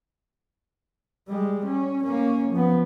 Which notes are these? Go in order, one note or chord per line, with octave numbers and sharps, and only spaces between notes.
G3 G#3
C#4
A#3 C#4
F3 B3